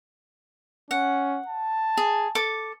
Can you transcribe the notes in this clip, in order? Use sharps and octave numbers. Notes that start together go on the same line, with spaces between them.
C#4 F#5
A5
G#4
A4 D6